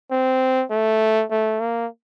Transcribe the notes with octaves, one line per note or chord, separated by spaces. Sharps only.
C4
A3
A3
A#3